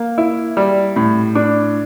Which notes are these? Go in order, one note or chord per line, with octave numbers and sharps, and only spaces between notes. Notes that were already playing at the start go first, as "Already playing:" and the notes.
Already playing: A#3
E4
G3
A2
D4